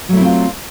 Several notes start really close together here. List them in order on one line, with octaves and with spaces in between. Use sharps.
F#3 A3 E4 C4 F4